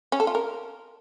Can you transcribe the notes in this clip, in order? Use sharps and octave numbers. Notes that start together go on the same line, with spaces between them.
C#4
A4
F4
A#4